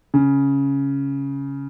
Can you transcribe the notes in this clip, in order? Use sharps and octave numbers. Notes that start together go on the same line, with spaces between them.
C#3